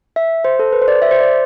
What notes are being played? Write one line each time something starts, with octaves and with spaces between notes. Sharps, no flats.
E5
C5
A4
B4
C5
D5
E5
C5
D5